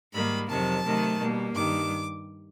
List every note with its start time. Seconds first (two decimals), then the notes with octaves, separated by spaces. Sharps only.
0.13 G#2 D#3 G3 A#3 B5
0.48 F2 C3 D#3 F#3 A5
0.84 C3 D#3 F#3 A3
1.18 B2 G3 A#3
1.54 G2 D#3 G3 D6